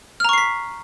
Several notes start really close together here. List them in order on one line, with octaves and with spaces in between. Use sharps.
F6 A#5 C#6 C7 B6